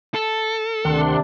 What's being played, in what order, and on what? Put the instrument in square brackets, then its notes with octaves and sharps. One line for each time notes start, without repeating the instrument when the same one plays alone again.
[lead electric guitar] A4
[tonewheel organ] D2 F#5 C6 [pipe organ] C3 D4 [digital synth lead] D#3